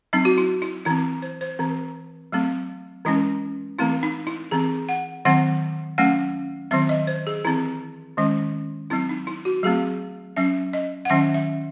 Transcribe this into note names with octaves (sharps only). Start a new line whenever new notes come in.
F#3 C4 D#4
F#4
E4
E4
E3 C4 E4
C5
C5
E3 C4
F#3 A3 C4
E3 G#3 C#4 E4
E3 A3 C4 E4
D#4
E4
E3 C4 G#4
F#5
D#3 F#3 C4 F#5
F#3 A3 C#4 F#5
D#3 F#3 C4 E5
D#5
C5
G#4
E3 C4 E4
D#3 G#3 C#4
F#3 C4 E4
D#4
E4
F#4
F#3 A3 C4 G#4
F#3 C#4 E5
D#5
F#5
D#3 F#3 C#4 E5
E5